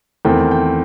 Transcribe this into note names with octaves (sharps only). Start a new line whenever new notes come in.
E2 D#3 A3 C4 G5
G5